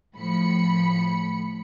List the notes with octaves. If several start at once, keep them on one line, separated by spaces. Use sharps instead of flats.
A2 F3 B5 C#7